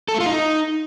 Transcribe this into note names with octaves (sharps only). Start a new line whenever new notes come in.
A4
A3
F4
D#4